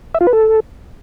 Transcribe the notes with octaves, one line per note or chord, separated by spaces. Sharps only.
E5
F4
B4
A4